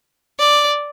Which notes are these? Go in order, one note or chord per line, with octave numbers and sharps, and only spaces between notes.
D5